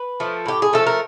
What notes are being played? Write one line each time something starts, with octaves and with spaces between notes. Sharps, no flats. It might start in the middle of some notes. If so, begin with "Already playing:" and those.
Already playing: B4
F3 A3
A2 G4
G#4
F3 A3 A4
A#4